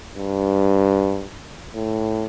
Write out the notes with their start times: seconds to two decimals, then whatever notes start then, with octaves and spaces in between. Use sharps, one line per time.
0.16 G2
1.75 A2